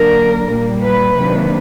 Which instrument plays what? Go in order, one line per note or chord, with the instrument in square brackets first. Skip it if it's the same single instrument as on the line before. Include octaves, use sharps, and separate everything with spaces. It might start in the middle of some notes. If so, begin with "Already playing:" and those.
Already playing: [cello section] D3 F#3 A#3 D4 A#4
A#2 G3 A#3
B4
C3 D#3 F#3 A#3 D4